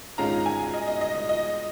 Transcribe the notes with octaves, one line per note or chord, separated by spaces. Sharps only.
G#2 D#3 G#3 C#4 F4 A#5
G#5
D#5
D#5
D#5
D#5
D#5